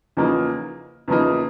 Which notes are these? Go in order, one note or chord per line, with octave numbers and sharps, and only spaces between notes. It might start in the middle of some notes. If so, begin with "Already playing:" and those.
E2 C#3 F3 A#3 D#4
E2 C#3 F3 A#3 D#4